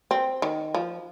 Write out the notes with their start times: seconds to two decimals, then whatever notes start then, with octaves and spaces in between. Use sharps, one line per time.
0.11 C4
0.42 D#3
0.75 F3